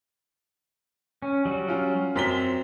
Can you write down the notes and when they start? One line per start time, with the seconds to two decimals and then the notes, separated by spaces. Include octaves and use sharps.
1.22 C#4
1.45 F#3 G3 F#4
1.68 C#4 F4
2.16 F#2 C4 B6 G7